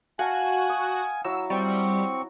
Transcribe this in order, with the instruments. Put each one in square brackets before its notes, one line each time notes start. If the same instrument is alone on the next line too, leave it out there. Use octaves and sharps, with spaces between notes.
[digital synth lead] F#4 [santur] F5 F#5 A5 [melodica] G#5
[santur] D#6
[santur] F#3 E4 A#5 [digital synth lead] E6
[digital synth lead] G3 [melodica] C4 C#6